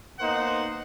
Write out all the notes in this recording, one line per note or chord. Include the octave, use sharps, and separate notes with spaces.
A#3 B3 D#4 C5 F#5